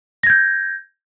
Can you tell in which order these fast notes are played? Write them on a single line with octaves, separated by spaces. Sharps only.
A#6 G#6 G6